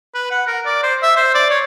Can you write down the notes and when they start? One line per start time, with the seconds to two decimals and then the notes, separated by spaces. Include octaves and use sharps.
0.14 B4
0.31 F#5
0.47 A#4
0.66 D5
0.83 C5
1.02 E5
1.16 C5
1.35 D5
1.50 C#5